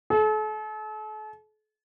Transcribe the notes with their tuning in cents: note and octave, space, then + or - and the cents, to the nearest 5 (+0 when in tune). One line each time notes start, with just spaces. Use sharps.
A4 -40